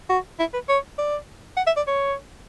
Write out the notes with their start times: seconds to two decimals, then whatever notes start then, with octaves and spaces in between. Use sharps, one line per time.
0.09 F#4
0.39 E4
0.53 B4
0.69 C#5
0.98 D5
1.57 F#5
1.67 E5
1.76 D5
1.87 C#5